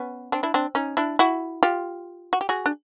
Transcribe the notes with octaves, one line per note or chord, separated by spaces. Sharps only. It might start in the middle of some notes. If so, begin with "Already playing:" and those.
Already playing: B3 C#4
C4 D4
D4 E4
C4 D4
C#4 D#4
D4 E4
E4 F#4
F4 G4
F#4
G4
F#4 G#4
D4